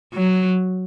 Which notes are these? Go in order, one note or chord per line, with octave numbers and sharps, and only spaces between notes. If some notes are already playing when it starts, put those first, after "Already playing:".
F#3